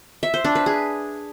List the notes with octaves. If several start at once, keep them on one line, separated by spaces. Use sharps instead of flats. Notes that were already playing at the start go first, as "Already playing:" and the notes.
E5
C5
D4
B4
G#4